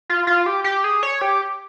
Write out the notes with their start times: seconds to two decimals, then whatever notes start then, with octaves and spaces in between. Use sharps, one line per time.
0.09 F4
0.27 F4
0.46 G4
0.64 G4
0.84 G#4
1.03 C#5
1.21 G4